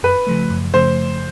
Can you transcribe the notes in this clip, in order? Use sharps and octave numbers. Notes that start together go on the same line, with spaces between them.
F#2 B4
C#3 F3 A3
F#2
C#3 F3 A3 C5